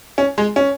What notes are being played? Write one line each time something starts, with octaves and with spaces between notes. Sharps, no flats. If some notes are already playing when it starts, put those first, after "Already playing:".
C#4
G#3
C#4